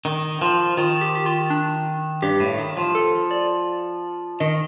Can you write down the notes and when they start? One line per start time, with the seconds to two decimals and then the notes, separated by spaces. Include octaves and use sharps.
0.05 D#3
0.42 F3
0.77 D#3 F4
1.01 G4
1.15 G4
1.26 F4
1.50 D4
2.22 G2 G4
2.40 A2
2.59 D#3
2.77 F3
2.95 A4
3.31 D5
4.40 D#3 D#5